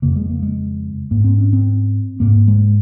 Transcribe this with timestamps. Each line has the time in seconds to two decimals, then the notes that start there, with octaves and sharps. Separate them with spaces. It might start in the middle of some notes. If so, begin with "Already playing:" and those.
0.02 F2 C#3 A#3
0.16 G#3
0.30 A#3
0.42 G#3
1.11 G#2 A#3
1.24 C4
1.38 C#4
1.53 C4
2.20 G#2 A#3
2.48 G#3